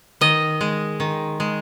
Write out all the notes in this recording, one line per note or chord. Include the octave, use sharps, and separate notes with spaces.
D#3 D#5
G#3
D#3
G#3